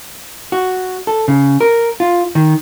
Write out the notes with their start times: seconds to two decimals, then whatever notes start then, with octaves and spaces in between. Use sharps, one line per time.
0.52 F#4
1.07 A4
1.28 C#3
1.61 A#4
2.00 F4
2.35 D#3